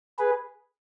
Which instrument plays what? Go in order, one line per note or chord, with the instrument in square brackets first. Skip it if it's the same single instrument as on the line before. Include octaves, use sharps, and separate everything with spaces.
[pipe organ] G#4 B4